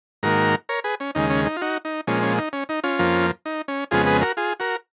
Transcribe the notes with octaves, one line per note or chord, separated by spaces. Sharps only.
G#2 D#3 A#3 F#4 A#4
A#4 C#5
G#4 B4
C#4
D#2 C#3 G#3 D#4
C#4
D#4
F4
D#4 F#4
D#4
A#2 F3 G#3 C#4
C#4
D#4
C#4
D#4
C#4 F4
F2 F3 A#3
D#4
C#4
F2 C#3 G#3 B3 F4 G#4
G#4 B4
F#4 A#4
F4 G#4
F#4 A#4